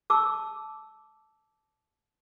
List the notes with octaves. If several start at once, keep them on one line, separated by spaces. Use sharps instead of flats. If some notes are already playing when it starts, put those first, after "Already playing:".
A5 D6 E6